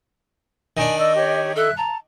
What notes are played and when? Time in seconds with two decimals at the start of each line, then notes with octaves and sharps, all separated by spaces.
0.77 D#3 D4 G#5
0.98 D5 D#5 E6
1.16 G4 C#5
1.56 A4 E5 F#6
1.77 A5 A#5